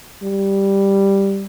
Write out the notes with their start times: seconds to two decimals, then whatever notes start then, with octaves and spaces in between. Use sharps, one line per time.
0.23 G3